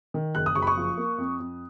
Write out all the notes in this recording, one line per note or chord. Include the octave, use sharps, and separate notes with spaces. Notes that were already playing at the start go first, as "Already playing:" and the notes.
D#3
F#1 F#6
D#6
F#1 C#6
B5
C#6
F3
A#3
F2
F2